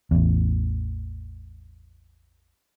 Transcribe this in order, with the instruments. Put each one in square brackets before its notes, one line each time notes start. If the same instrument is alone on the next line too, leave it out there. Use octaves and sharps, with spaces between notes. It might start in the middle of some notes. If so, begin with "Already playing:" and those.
[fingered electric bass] A1 E2